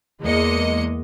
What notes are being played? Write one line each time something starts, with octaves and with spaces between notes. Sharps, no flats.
E2 G#3 A#3 D#5 C#7